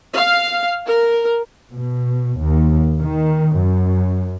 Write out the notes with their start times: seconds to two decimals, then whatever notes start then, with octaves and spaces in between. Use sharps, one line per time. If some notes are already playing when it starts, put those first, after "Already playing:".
0.14 F5
0.87 A#4
1.70 B2
2.39 D#2
2.98 D#3
3.56 F#2